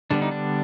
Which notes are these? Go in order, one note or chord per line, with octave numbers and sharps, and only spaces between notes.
D3 G3 B3 D4
D#4
D4